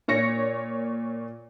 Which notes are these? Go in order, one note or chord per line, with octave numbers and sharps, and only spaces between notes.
A#2 C#5 A#6 C#7